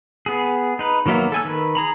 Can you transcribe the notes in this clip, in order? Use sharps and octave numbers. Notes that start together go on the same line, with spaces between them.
B3 G#4
D#4 B4
D#3 F#3 A#3 B3 E5
A4 G#5 E6
D#3 B4
G#4 A#5 B5